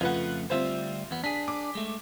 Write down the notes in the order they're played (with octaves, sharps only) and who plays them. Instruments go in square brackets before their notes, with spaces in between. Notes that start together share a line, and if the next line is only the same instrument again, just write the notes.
[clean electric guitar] F2 C#3 A3 [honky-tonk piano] F4 B4 F#5
[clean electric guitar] D2 G3 E5 [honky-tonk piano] C4 F4 C5
[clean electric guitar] E2 B3
[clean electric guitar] D4 G#4 [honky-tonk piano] B6
[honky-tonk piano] D6
[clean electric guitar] G#3 A3